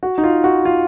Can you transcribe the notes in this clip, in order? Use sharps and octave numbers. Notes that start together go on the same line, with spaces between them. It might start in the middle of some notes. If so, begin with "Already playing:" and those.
F#4
D#4
F4
F#4
F4